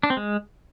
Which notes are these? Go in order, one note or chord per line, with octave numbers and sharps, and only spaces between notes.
D4
C4
G#3